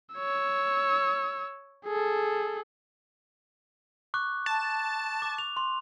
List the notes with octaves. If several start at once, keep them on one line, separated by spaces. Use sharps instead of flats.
C#5 E6
G#4 A4
C#6 D6 F#6
A5
D6
F7
C6